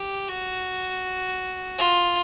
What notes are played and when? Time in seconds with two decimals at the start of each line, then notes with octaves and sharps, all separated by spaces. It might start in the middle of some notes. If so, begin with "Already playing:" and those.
Already playing: G4
0.29 F#4
1.78 F4